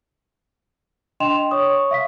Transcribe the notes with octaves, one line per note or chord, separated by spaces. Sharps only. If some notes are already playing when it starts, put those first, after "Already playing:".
D4 D#5 G5 C6 E7 F7
C#5 C#6 D#6
E5 F5 B6